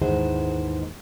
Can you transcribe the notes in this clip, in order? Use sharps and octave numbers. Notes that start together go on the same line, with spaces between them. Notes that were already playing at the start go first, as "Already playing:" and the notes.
D#2 G#2 E3 G#3 C5 F#5